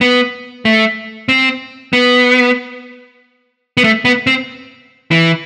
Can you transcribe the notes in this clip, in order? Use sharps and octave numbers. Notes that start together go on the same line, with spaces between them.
B3
A3
C4
B3
B3
A3
B3
C4
E3